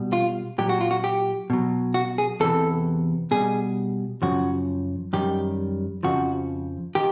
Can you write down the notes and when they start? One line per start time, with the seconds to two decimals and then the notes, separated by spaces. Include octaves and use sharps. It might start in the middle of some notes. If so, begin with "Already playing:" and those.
Already playing: B2 G3
0.13 F4
0.58 A#2 F#3 G4
0.69 F#4
0.81 F4
0.91 F#4
1.04 G4
1.50 B2 F#3
1.94 F#4
2.18 G#4
2.40 E2 C3 E3 A4
3.31 B2 G3 G#4
4.22 F#2 C#3 F3 F#4
5.13 F#2 D#3 G3 G4
6.03 F2 C#3 F3 F#4
6.95 D#3 G4